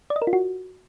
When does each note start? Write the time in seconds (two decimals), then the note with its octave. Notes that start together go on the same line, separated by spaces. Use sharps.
0.10 D5
0.16 D#5
0.22 A#4
0.27 F4
0.33 F#4